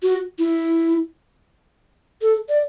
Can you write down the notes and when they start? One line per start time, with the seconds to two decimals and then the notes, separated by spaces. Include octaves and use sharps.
0.03 F#4
0.39 E4
2.22 A4
2.49 D5